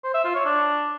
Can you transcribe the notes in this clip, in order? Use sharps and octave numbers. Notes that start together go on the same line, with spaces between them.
C5
E5
F4
C#5
D4